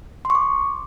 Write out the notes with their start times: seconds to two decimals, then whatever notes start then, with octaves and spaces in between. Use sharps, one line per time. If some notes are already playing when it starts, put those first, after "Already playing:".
0.25 C6
0.30 C#6
0.35 D6